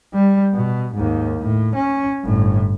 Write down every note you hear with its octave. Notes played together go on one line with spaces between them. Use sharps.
G3
B2
D#2 G#2
A2
C#4
G1 A2